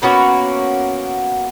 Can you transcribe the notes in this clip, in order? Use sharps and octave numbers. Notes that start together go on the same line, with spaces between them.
A#3 B3 C#4 F#4